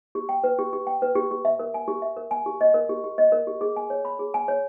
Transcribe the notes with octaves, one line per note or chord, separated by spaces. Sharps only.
G4
G5
B4
G4
G4
G5
B4
G4
G4
E5
A#4
G#5
G4
E5
A#4
G#5
G4
D#5
A#4
G4
G4
D#5
A#4
G4
G#4
G#5
C#5
B5
G#4
G#5
C#5